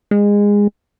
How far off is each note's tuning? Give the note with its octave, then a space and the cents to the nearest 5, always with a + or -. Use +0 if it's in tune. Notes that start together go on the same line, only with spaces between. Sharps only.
G#3 -20